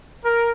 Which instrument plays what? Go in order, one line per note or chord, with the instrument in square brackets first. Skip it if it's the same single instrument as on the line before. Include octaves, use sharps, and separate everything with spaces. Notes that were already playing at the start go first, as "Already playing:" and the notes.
[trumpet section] A#4